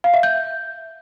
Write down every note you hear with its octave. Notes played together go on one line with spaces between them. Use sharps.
F5
E5
G6